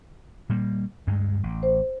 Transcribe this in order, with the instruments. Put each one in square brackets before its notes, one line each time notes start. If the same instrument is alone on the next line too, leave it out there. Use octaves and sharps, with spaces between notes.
[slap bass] A#2 G3 A#3
D2 G2 G#3
A1
[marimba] C5